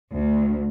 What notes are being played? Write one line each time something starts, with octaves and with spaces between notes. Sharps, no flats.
D2